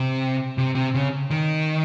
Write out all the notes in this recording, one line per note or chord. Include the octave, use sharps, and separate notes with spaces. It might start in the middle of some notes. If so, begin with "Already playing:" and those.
Already playing: C3
C3
C3
C#3
D#3